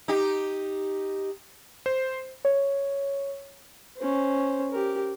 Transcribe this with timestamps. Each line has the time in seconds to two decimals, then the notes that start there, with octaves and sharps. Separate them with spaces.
0.08 D#4 G4
1.86 C5
2.45 C#5
3.97 C#4 C5
4.71 G4 A#4